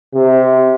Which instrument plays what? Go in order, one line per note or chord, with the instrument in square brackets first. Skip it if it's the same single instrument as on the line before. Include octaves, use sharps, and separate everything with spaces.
[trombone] C3